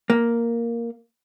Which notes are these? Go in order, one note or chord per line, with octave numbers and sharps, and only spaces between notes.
A#3